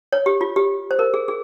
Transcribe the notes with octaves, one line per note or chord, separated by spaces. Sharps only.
C#5
G4
F4
G4
C5
A#4
G#4
G#4